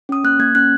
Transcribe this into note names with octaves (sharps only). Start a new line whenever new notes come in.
C#4 D#6
A#3 F#6
A#3 G#6
C#4 F#6